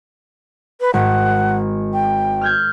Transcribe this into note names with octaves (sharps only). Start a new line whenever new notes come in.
B4
G#1 F#5
G5
F6 G6 G#6